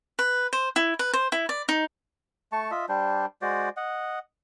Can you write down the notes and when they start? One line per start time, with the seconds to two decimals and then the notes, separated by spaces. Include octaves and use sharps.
0.19 B4
0.53 C5
0.76 E4
0.99 B4
1.14 C5
1.32 E4
1.49 D5
1.69 D#4
2.52 A3 A5 C#6
2.71 F4 D#5 E5
2.89 G3 D4 C5
3.42 G#3 F#4 C5 D5
3.77 D#5 F#5